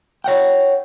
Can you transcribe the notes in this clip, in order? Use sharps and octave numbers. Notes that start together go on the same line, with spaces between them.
C#5 F#5 G5